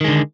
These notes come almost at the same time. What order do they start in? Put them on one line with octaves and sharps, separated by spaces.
D#3 G#3 D3